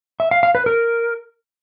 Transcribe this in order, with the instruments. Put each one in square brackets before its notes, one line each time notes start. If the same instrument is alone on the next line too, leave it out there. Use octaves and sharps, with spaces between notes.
[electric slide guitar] E5
F5
F5
B4
A#4